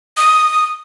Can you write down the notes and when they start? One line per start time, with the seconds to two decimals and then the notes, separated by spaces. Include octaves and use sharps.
0.17 D#6